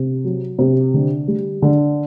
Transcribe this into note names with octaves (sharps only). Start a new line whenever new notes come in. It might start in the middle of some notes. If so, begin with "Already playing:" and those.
Already playing: C3
F#3
C3
D3
G3
D3